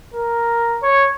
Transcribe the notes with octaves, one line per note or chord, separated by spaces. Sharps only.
A#4
C#5